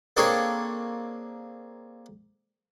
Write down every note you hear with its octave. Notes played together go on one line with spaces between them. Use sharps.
A#3 C4 D4 G#4 A4 C#5